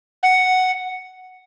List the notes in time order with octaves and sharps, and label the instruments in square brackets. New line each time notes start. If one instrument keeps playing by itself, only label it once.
[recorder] F#5